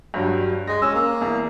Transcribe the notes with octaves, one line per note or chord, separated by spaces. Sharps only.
G2 F#3 G3
G#3 A#6
C#4 E6
A#3
E2